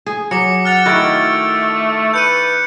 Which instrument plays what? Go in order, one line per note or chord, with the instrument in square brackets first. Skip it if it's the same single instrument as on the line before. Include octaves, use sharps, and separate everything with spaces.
[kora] G#4
[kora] F#3 [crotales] D6 C#7
[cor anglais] F#5 [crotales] F6 A6 F7
[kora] D#3 E4 F#4 [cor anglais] A3 [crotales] A6 D7
[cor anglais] B4 [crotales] G6 C#7 D#7